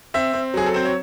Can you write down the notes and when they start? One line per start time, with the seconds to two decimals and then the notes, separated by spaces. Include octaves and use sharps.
0.14 C4 E5
0.33 C4
0.54 F#3 G#4
0.66 A4
0.74 C4 C5
0.85 C#5